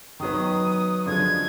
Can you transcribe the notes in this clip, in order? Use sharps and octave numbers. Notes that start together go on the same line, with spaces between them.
D#3 F#3 B3 D#6
D3 F3 G#3 G#6